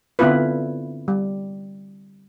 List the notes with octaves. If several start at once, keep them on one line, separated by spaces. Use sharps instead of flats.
D3 B3 C4 E4 F4 B4
G3